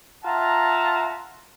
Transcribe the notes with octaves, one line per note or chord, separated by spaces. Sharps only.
F4 E5 F#5 A5 A#5